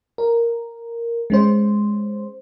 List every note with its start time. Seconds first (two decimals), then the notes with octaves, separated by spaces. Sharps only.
0.18 A#4
1.30 G#3 C#4 C5